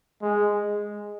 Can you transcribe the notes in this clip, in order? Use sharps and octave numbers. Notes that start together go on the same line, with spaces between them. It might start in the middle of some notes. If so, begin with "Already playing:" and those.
G#3